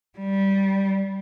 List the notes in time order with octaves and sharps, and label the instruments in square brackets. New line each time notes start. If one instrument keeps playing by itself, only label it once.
[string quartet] G3